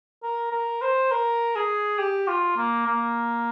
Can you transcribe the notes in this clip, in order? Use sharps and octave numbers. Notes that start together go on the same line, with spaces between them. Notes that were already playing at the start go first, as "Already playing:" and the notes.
A#4
A#4
C5
A#4
G#4
G4
F4
A#3
A#3